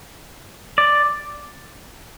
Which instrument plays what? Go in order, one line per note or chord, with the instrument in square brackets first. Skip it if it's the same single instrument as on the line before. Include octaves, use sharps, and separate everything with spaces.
[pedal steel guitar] D5